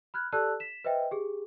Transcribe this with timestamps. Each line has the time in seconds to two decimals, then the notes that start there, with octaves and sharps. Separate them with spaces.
0.14 B5 F6 F#6 G#6
0.32 G4 A4 D5 A5 E6 F#6
0.60 B6 E7
0.84 B4 C5 D#5 E5 G5
1.11 G4 G#4